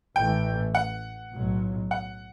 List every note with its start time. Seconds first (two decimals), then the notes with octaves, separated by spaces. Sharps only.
0.16 A1 A2 E3 A3 G5
0.75 F#5
1.33 B1 A2 F#3
1.91 F#5